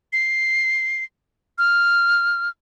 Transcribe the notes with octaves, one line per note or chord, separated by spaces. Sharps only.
C7
F6